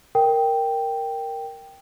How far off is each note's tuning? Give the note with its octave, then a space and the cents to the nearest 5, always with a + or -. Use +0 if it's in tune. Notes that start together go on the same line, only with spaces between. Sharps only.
A#4 +0 G5 +0